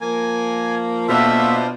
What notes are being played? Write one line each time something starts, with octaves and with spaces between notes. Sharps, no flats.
F3 A#3 G#5
B2 A3 A#3 D4 F4 C5 E5